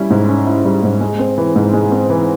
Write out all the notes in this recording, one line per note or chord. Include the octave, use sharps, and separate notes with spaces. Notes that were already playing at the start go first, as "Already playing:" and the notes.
Already playing: G3 C#4 E4
G#2
C#4
E4
G3
G#2
G#3
C4
E3
G#2
G#3
C4
E3